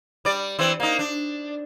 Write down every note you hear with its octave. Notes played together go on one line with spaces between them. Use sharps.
G3 D5
E3 C4
A#3 D#4
D4